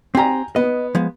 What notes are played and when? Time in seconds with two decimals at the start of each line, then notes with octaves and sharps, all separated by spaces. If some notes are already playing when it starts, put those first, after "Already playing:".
0.15 C4 G4 G5 G#5 A#5
0.56 B3 D#5
0.95 F3 G#3 B3